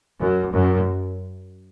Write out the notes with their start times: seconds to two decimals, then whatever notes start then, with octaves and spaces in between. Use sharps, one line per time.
0.21 F#2
0.53 F#2